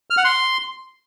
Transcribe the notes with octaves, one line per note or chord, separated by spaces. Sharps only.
F6
F#5
C6